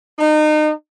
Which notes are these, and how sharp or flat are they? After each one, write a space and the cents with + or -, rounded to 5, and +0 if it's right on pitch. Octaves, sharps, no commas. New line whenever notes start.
D#4 -30